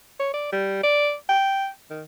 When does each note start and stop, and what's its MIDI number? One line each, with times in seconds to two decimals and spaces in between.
0.20 0.32 73
0.34 0.51 74
0.52 0.81 55
0.83 1.15 74
1.29 1.68 79
1.91 2.03 51